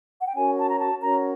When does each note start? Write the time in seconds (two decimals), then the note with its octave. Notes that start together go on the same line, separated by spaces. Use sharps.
0.20 F#5
0.27 G5
0.35 C#4 F#4 A#4 C#5 G#5
0.57 A5
0.68 A#5
0.80 A5
1.01 C#4 F#4 A#4 C#5 A#5